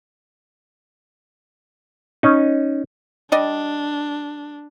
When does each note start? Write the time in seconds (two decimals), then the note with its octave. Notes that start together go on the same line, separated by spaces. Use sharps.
2.23 C#4 D#4
3.32 G3 D4 D5 D#5